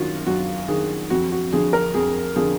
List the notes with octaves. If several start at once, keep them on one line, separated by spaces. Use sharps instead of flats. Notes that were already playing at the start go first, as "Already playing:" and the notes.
Already playing: F#2 D#3 F4 F#4
F#2 F#4
D#3 G#4
F2 F#4
F#4
D3 F3 G#4
A#4
F2 G#4
D3 F3 G#4